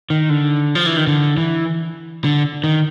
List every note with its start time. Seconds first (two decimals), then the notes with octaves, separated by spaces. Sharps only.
0.10 D#3
0.29 D3
0.75 F3
0.86 E3
0.97 D#3
1.07 D3
1.37 E3
2.25 D3
2.64 D#3